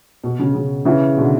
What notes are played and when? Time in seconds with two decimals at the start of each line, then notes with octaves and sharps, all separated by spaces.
0.24 B2
0.39 C#3
0.55 C#3
0.85 C#3 E3
1.17 B2 D3